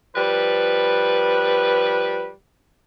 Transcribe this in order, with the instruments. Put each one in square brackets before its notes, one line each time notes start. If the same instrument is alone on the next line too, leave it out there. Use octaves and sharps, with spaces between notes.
[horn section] F3 G3 B4